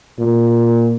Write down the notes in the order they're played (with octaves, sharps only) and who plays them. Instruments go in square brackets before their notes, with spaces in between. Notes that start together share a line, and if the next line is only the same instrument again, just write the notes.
[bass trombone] A#2